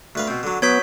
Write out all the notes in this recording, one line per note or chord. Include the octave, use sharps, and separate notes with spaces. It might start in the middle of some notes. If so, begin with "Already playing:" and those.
D2 B4 F5
B2 C4
D3 F#3
F#3 B3 C#5 D#6 G6 B6